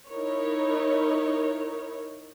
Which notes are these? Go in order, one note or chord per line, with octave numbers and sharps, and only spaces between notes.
D#4 E4 A#4 C#5